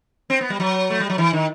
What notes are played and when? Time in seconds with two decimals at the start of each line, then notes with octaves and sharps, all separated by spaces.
0.30 C4
0.41 B3
0.50 G3
0.60 F#3
0.90 A3
1.00 G3
1.10 F#3
1.18 E3
1.33 D#3